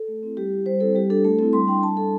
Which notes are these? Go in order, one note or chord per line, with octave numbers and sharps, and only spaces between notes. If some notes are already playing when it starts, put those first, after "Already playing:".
Already playing: A4
A3
C4 E4
G3 G4
E4
G3 C5
C4 E4 A4
G3 G4
D4 A4
A3 A4
C4 E4 A4
G3 C6
D4 G5
G3 A5
D4 A4